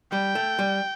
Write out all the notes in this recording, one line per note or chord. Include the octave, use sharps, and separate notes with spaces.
G3 G5
A3
G3